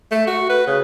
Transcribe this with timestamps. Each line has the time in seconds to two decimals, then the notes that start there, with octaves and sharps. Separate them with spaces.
0.11 A3
0.27 F#4
0.49 B4
0.67 C#3